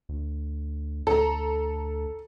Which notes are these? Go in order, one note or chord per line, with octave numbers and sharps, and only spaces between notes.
D2
D2 A4 A#5